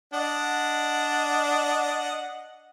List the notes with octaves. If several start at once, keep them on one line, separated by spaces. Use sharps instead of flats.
D4 D#5 F#5